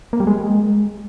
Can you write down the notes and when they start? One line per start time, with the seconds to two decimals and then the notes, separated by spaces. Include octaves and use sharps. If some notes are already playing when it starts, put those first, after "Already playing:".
0.13 A#3
0.20 G3
0.27 G#3